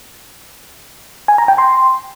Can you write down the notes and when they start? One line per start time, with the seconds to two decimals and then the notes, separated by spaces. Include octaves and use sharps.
1.28 G#5
1.38 A#5
1.48 G5
1.58 C6